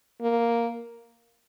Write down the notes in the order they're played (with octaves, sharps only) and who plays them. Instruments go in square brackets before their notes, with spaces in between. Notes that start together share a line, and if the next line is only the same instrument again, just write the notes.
[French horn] A#3